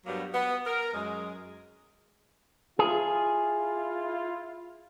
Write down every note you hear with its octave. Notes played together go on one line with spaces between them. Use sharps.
G2 F#3 G3 A#3 B3
B3
A#4
F#2 G#3
E4 F4 G#4